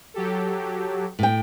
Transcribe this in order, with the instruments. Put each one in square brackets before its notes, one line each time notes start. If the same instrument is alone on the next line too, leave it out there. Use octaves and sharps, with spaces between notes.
[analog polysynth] F#3 G4 A4
[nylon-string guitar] A2 G5